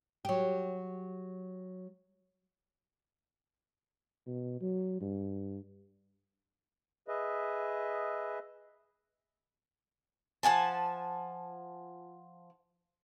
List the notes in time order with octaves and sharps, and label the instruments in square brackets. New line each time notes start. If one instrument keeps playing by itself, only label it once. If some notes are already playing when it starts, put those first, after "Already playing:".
[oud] F#3 G4
[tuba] B2
F#3
G2
[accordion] G#4 B4 D#5 E5
[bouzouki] F3 F#5 G#5 A5